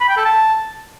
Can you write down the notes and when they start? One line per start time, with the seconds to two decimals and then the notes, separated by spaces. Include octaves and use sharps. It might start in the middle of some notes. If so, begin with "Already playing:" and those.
0.01 B5
0.09 G5
0.17 A4
0.25 A5